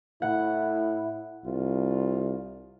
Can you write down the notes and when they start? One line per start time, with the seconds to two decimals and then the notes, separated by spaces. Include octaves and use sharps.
0.22 A2 E4 F#5
1.46 C2 F4